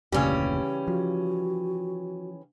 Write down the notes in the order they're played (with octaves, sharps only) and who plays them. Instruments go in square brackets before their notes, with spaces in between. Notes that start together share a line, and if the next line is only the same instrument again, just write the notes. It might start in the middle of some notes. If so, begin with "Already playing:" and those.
[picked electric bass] F1 D2 A#2 [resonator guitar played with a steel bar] C#3 G3 G4 [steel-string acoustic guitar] E3 C#4
[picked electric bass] F3 [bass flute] F#4